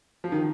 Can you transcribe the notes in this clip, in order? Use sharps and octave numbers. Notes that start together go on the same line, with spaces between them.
F3
D#3